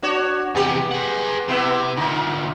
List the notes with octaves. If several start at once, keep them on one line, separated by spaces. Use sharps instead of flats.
D4 F#4 C#5
E2 C3 B3 G4
G#4 F#5
C3 B3 E4
D2 A#2 D#4